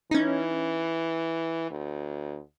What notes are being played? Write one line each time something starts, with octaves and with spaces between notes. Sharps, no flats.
E3 C#4 D#4
D2